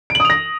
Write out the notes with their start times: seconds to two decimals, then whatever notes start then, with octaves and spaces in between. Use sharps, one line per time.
0.10 D7
0.15 F#7
0.20 D#6
0.25 F7
0.30 A#6